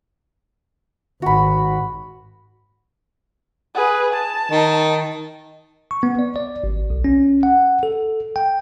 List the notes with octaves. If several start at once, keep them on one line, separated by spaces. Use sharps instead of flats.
G#1 F#4 B5
G#4 B4
A5
D#3
C#6
B3
D5
D5
G#1
B1
C#4
F#5
A4
G5